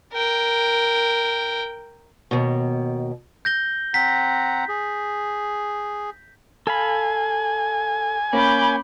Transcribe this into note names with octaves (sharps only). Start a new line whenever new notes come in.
A#4 G5
D#2 B2
G6 A#6 G7
C4 F#5 A#5 B6
G#4
A4 F5 G#5 B5
A#3 C#4 B5 D6 G6